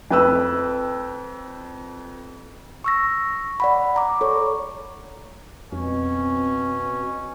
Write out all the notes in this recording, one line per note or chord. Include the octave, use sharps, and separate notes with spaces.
F2 B4 E6
C#6 E6 A#6
D5 F#5 B5
A#5 D6
A4 C#5 C#6
F2 B2 C4 C#4